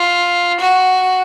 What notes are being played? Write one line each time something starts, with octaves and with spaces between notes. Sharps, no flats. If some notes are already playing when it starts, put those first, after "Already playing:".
Already playing: F4
F#4